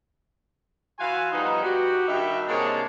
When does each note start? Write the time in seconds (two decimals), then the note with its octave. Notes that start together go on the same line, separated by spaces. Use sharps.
0.99 E3 F#4 F5 F#5 G#5 C6
1.32 F3 G3 B3 D#4
1.63 F#4 G4
2.07 G2 D#3 D#4 F#4 G4 E5
2.48 G#2 C3 G#3 A#3 D4 C#5